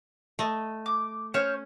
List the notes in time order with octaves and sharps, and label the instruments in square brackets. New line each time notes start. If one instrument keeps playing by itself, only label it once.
[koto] A3 D#5
[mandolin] D6
[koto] C#4 [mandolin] C5 C#5 F6